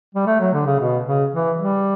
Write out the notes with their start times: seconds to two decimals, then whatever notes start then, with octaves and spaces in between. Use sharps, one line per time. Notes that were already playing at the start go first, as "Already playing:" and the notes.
0.15 G3
0.26 A3
0.40 F#3
0.53 D3
0.66 C#3
0.79 B2
1.06 C#3
1.32 E3
1.58 G3